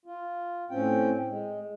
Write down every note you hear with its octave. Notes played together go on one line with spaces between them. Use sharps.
F4
A2 C4 C#4 G5
G#3